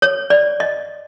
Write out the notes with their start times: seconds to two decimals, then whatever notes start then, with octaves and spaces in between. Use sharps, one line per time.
0.02 C#5
0.30 D5
0.60 D#5